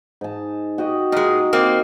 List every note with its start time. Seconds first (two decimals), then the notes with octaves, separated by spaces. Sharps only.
0.21 G#2 A5
0.78 F#4 G4 D#5
1.12 A#2 G#3 D#4
1.53 A#3 C4